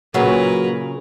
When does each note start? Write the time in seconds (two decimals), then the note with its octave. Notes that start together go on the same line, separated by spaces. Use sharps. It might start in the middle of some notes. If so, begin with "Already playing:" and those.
0.14 A#2 C#3 F#3 A#4 B4 A#5